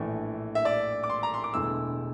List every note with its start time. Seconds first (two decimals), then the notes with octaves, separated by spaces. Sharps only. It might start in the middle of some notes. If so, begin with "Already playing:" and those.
Already playing: A#1 A2 E3 A3 D4
0.55 E5
0.65 D5
1.04 D6
1.10 C6
1.23 A#5
1.34 C6
1.44 D6
1.54 E1 E2 D3 A3 E4 E6